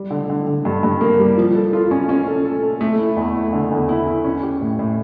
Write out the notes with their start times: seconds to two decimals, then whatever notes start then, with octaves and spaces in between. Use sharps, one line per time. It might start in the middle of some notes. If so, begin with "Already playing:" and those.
Already playing: G3
0.10 D3
0.30 D3
0.47 D3
0.65 G2
0.83 G2
1.01 A#3
1.19 G3
1.37 F3
1.55 A4
1.73 F4
1.91 C#4
2.09 C#4
2.27 A4
2.45 A4
2.62 A4
2.81 A3
2.98 E4
3.16 E2
3.35 E4
3.53 D3
3.71 E2
3.89 E4
4.07 E4
4.25 C#4
4.43 G4
4.61 A2
4.79 A2